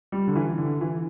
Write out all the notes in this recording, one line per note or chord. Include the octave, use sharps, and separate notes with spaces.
G3
D3
E3
D3
E3